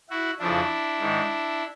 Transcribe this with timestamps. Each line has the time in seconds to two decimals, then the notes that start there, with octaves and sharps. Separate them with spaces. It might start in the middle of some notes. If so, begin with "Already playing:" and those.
0.10 E4 F#4
0.39 F2 C#3 F3 D4 E4
0.99 G#2 D#3